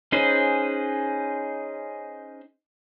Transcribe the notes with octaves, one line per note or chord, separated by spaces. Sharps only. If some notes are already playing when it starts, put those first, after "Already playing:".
C#4 D#4 G#4 B4 C5